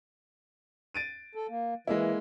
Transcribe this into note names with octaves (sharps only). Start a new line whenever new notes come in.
A6 D7 D#7
A4
A#3
E3 G#3 A#3 E4